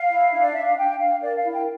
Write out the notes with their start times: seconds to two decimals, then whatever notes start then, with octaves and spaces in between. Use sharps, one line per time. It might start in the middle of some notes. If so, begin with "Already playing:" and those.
Already playing: F5
0.10 E4
0.32 D4
0.41 D5
0.53 D4 E5
0.65 F5
0.77 D4 G5
0.99 D4 F5
1.21 A#4 D5
1.36 F5
1.43 E4
1.52 G5